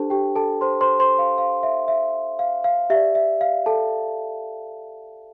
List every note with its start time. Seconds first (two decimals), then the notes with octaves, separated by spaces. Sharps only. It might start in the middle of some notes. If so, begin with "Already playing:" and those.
Already playing: D4 G4 A4 C5 A5
0.10 G4 G5
0.36 A4 A5
0.61 C5 C6
0.81 C5 C6
0.99 C5 C6
1.19 F5
1.38 F5
1.63 E5
1.88 E5
2.39 F5
2.64 F5
2.90 G4 D5 E5
3.15 E5
3.41 F5
3.66 A4 A5